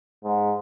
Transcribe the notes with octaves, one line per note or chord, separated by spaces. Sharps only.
G#2